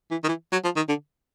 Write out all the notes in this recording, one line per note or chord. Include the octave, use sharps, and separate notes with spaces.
E3
D#3
E3
F#3
F3
D#3
D3